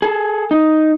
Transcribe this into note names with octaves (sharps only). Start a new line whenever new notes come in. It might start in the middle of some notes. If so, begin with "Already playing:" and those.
G#4 A4
D#4